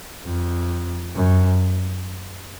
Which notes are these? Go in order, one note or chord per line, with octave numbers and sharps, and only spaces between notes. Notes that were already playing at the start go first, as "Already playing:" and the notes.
F2
F#2